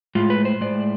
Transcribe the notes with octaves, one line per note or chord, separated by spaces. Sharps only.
A2 G#3 F4
B4
C5
A2 G#3 D5